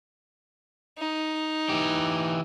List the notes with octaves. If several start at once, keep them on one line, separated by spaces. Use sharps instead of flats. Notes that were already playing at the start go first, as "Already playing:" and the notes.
D#4
E3 G4